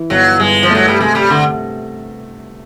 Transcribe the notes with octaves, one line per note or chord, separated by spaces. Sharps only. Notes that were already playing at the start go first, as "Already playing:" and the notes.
Already playing: E3
G1 F#3
G2 G#3
F3
F#3 A3
G3
C3 G#3
G3
D3